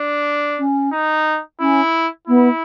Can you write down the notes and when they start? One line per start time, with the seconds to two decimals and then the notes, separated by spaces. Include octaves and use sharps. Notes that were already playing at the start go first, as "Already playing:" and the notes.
Already playing: D4
0.58 C#4
0.92 D#4
1.60 C#4 E4
2.27 B3 E4